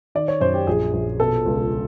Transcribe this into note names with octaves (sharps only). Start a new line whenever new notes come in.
D#3 D5
C#5
F#2 C5
G4
A#1 G#4
A#1
B2 A4
C#2